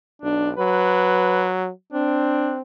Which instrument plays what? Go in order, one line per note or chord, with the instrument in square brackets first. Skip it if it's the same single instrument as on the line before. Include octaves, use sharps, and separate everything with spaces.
[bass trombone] B1 [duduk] D4
[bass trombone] F#3 [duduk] B4
[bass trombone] C4 [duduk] D4